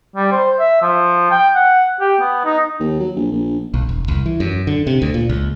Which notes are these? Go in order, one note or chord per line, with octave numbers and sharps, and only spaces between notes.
G3
C5
E5
F3
G5
F#5
G4
B3
D#4
D#2
F#3
A#1
A#1
B1
E1
C2
E3
F#2
D3
C3
D2
A#2
C#2